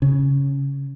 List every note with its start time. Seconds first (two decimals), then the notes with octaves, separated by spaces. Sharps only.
0.02 C#3